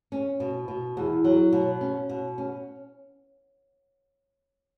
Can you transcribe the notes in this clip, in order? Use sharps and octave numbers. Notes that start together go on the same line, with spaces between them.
C#4
B2
B2
E2
F#3
B2
C#4
B2
C#4